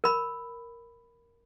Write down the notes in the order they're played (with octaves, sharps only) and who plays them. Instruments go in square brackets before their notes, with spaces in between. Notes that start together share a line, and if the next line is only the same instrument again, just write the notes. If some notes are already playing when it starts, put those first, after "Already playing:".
[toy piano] A#4 B5